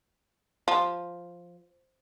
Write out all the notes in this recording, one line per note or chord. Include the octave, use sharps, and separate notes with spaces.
F3